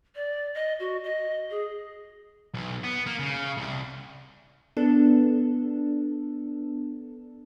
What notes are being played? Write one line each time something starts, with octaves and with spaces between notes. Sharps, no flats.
D5
D#5
F#4
D#5
G#4
B1
B3
A#3
C#3
C2
B3 D4 A4